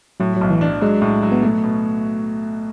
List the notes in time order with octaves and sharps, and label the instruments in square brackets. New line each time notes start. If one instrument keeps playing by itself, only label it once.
[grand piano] A2 [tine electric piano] F#3
[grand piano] B1 [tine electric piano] F#3
[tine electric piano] E3
[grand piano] D4
[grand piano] F#3 [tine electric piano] G#3
[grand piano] A2
F#3
[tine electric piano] B3
[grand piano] B2 [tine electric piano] A3
[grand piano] B2